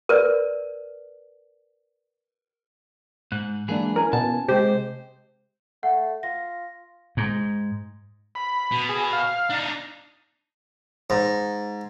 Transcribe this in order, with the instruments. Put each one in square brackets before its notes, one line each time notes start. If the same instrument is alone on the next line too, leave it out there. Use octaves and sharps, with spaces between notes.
[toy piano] A#4 B4 D5
[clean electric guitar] G#2 [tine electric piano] F#6
[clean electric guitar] E3 F#3 G#4 [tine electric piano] G#3 A#3 D4
[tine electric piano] C#4 E4 G#5 [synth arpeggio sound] A#4
[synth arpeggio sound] B2 [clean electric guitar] A5
[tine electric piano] C3 G#3 [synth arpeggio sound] G4 [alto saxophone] C5
[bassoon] A3 [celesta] F#5
[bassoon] F4 [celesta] A#6
[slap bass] G#2
[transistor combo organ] B5
[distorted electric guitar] B2
[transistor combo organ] G#4
F5
[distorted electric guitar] D4 D#4
[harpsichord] G#2